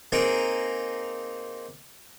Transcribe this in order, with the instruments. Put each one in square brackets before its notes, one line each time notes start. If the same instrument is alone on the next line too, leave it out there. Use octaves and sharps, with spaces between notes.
[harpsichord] A#3 C4 D#4 G#4 A#4